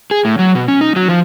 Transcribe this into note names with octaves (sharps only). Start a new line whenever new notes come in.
G#4
A2
F#3
B2
C#4
D#4
F#3
F3